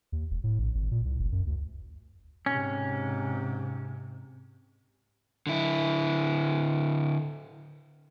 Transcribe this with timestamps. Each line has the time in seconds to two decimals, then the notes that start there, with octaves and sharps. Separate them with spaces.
0.12 D#2
0.31 E1
0.44 A2
0.59 A#1
0.75 G#1
0.91 A#2
1.05 C2
1.20 F#1
1.32 F#2
1.47 D2
2.46 G#2 C3 C#4
5.47 D3 E4